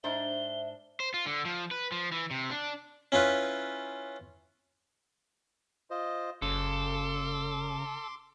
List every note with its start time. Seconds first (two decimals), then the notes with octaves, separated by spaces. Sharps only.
0.04 G#2 D4 C5 E5 G7
1.00 C5
1.14 F4
1.26 D3
1.45 F3
1.71 B4
1.92 F3
2.12 E3
2.31 C3
2.51 D4
3.12 C#4 E4 F4 B4
5.90 F4 C5 D#5
6.42 F#1 C#3 A4 C6 D6